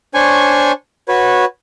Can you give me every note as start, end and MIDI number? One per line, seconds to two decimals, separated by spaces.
0.14 0.72 62
0.14 0.72 72
0.14 0.72 73
0.14 0.72 80
0.14 0.72 85
1.08 1.45 66
1.08 1.45 71
1.08 1.45 73